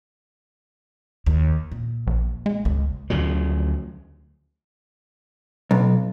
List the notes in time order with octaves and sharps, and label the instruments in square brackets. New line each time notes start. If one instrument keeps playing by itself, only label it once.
[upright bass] D#2
A#2
[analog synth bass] A#1
G#3
[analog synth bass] G#1 [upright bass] C#2
[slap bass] D2 C#3 F3 F#3
[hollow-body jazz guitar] B1